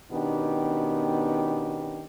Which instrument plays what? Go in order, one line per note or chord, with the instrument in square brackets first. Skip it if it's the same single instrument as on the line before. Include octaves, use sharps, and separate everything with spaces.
[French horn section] B2 D#3 B3 C#4 D4 G4